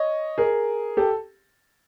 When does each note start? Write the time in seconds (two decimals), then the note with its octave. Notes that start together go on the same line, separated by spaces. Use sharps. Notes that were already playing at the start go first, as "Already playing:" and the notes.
Already playing: C#5 D#5
0.38 G#4 A#4
0.97 G4 A4